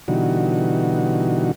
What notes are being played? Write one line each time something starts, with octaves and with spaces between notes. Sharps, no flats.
B2 D3 E3 G3 D#4 F#4